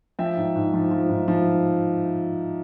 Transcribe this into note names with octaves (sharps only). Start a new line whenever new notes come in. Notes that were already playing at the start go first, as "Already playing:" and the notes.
F3 E5 G5
G#2
G#2
F3
F3
G#2
F3